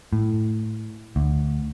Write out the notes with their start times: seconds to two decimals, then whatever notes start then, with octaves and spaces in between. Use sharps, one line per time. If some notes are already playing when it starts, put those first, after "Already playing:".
0.13 A2
1.16 D2